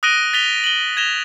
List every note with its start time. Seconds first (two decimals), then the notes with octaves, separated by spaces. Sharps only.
0.03 D#6 F#6 A#6 D7 D#7 G7
0.33 A6 B6 F7 G7
0.64 F#7 G7
0.97 G#6 A#6 E7 F7 G7